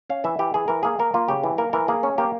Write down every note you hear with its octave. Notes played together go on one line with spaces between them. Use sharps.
C#4 F5
E3 E5
E3 G4
E3 G#4
E3 A#4
A#3 G#4
A#3 A#4
A#3 F4
C#3 G4
E3
A#3 A#4
E3 A#4
A#3 G#4
C#4
A#3 G4